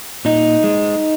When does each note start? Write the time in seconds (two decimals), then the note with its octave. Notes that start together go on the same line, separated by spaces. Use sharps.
0.25 A#2 D#4
0.64 G#3